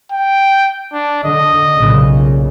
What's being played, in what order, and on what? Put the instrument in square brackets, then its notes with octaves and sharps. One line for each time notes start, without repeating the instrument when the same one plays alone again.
[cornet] G5
D4
[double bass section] D3 [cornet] D#5
[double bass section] B1 A#2 C#3